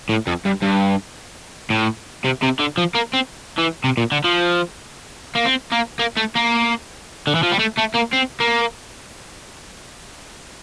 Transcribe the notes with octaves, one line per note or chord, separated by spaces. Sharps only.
A2
F2
G2
G2
A2
C3
C3
D3
F3
A#3
C4
E3
C3
A#2
D3
F3
A#3
C4
A#3
A#3
A3
A#3
D3
E3
F3
G3
A3
A3
A#3
C4
A#3